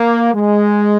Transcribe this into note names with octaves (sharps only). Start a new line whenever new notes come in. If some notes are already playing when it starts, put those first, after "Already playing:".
Already playing: A#3
G#3